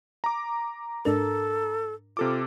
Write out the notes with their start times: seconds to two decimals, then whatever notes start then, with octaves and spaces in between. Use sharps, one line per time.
0.24 A#5 D6
1.05 G#2 D4 A4 A#4
2.17 C3 F4 A4 D6